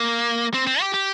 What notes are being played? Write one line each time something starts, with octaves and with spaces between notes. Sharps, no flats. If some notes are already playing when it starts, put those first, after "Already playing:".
Already playing: A#3
C4
C4
G4
G4